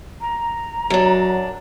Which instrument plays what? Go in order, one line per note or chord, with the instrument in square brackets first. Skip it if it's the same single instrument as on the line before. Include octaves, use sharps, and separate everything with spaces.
[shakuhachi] A#5
[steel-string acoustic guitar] F#2 D4 [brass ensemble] F#3